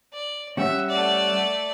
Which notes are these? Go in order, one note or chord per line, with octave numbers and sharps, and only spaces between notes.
D5
G3 C#4 E5 F#5
A3 D5